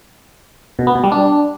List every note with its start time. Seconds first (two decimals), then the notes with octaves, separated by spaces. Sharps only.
0.79 B2
0.87 B3
0.95 B2
1.03 G3
1.12 D4